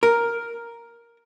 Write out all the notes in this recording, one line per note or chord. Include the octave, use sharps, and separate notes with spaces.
A#4